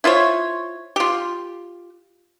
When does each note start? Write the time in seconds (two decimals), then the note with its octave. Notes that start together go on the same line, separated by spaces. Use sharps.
0.04 E4 F4 C5 C#5
0.96 F4 G4